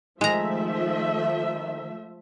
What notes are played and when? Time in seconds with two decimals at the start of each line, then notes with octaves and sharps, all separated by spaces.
0.21 D#3 F3 G#3 A3 E5 A#5